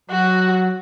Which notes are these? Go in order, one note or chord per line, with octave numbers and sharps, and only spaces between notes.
F#3 F#4